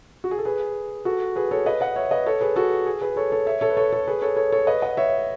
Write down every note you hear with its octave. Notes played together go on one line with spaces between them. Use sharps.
F#4
G#4
A4
G#4 B4
F#4 A4
G#4 B4
A4 C#5
B4 D#5
D#5 F#5
C#5 E5
B4 D#5
A4 C#5
G#4 B4
F#4 A4
G#4
G#4 B4
A4 C#5
A4 C#5
C#5 E5
A4 C#5
B4
A4 C#5
A4 C#5
G#4 B4
A4 C#5
A4 C#5
A4 C#5
B4 D#5
D#5 F#5
C#5 E5